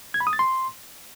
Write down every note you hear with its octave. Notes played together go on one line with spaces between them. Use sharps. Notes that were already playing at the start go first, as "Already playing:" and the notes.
G#6
B5
D#6
A6
C6